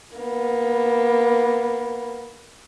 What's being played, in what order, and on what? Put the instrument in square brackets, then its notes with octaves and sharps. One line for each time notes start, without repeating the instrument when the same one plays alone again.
[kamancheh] A#3 B3